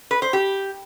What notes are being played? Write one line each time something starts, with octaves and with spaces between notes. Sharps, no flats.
B4
C5
G4